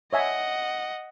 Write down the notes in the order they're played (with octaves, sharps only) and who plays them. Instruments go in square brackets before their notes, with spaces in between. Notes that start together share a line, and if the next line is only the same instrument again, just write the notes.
[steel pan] C#5 E5 G#5 [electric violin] D#5 F#5